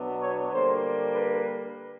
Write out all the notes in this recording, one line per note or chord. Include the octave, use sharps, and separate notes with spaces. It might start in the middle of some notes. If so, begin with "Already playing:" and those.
Already playing: B2 F#3 B3 D4
C#5
D3 G3 A#3 C5
B4